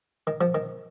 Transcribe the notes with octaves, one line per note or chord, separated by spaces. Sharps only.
D#3
F3
D#3